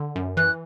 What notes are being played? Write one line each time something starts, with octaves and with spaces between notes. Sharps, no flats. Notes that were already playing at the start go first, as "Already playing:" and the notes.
Already playing: D3
F#2
E3 F#6